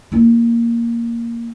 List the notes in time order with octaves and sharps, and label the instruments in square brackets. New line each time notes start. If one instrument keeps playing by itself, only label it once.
[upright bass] A#3 E4